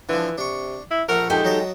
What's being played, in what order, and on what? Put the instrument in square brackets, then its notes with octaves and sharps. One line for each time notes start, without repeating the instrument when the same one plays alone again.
[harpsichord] D3 F3 [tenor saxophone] E3
[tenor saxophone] C3 [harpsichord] D4 C#6
[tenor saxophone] E4
[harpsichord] A#1 A3 F#5 [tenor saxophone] A#4
[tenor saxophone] G#3 [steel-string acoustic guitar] D#4 G4 A4
[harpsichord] F#3 D#5 A5